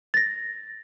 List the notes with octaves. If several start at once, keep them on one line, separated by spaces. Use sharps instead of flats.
A6 A#6